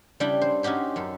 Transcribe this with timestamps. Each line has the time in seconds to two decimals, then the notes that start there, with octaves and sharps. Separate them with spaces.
0.20 C#3 G3 D4 E4 G5
0.41 C5
0.63 C#4 D#4 F#4 G4 C5
0.96 F#2 A4